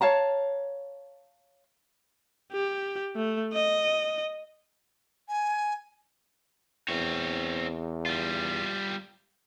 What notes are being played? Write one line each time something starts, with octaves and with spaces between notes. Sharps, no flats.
C#5 F5 A5 A#5
G4
A3
D#5
G#5
E2 C4 C#5
G3 F4